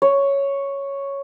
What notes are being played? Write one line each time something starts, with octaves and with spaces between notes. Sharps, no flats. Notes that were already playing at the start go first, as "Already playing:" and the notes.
C#5